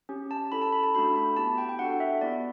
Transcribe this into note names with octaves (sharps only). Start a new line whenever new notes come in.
C#4 G4
A5
C#4 E4 A4 B5
A5
B5
A5
A3 D4 F#4 A4 B5
B5
B3 E4 G4 A5
G5
G5
D4 F#4 A4 F#5
E5
B3 E4 G4 D5